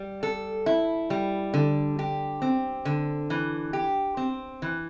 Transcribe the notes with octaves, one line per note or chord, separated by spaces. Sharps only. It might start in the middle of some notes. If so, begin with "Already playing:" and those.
Already playing: G3
A4
E4
G3
D3
G4
C4
D3
E3
G4
C4
E3